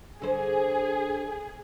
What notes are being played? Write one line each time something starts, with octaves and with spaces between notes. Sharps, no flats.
D3 G#4 C5